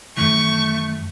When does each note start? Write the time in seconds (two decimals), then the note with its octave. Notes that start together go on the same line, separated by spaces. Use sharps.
0.17 F#2 D#3 E3 A3 C#6